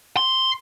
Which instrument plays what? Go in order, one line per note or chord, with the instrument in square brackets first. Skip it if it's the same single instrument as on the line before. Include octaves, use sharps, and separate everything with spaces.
[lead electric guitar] C6